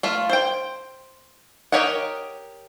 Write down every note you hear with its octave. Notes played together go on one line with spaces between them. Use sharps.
A3 F4
C5 G5
G4 A#4 C#5 D#5 F#5